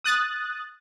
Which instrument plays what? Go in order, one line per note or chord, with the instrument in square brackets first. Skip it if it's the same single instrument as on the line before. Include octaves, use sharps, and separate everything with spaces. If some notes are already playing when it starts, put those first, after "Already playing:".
[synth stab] D#6 F#6 A6